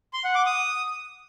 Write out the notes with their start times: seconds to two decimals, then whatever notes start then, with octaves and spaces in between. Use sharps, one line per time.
0.13 C6
0.24 F#5
0.35 D6
0.46 D#6